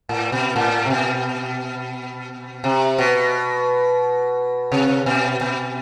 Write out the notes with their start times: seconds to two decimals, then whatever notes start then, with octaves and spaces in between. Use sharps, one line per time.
0.09 A2
0.32 B2
0.56 A2
0.85 C3
0.90 B2
2.64 C3
2.98 B2
4.72 C3
5.06 B2
5.41 B2